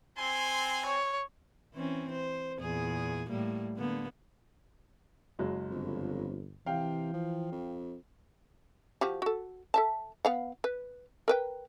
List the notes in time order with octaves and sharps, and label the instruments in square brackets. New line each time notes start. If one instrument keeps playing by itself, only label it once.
[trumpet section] C4 G#5 [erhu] C6
[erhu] C#5
[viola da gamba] E3 C4 C#4
C5
E2 A#2 G#4
A2 G3 A#3
D3 A#3 B3
[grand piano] F#1 F#3 G#3
[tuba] G1 [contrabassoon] F2
[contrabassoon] C3 [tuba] E3 [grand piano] F5 G5
[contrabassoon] F3
F2
[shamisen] F3 F#4 G4
F#4 A4
A4 E5 A5
B3 F5 F#5
B4
A#4 B4 G5